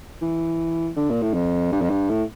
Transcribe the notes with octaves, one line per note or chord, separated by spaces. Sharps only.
E3
D3
A#2
A2
F2
G2
F2
G2
A2